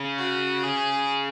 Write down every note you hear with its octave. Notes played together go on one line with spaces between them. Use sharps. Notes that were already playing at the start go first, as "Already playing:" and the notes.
Already playing: C#3
F#4
G#4